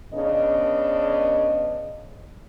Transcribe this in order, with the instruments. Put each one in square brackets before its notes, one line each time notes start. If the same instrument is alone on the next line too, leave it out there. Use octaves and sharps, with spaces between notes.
[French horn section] C#3 B3 D4 D#5